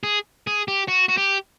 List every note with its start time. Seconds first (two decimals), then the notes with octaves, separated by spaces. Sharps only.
0.03 G#4
0.47 G#4
0.68 G4
0.88 F#4
1.09 F#4
1.18 G4